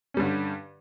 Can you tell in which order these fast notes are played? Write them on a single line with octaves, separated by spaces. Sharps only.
C#4 G3 G2 D3